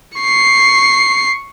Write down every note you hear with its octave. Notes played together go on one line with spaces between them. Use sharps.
C#6 C7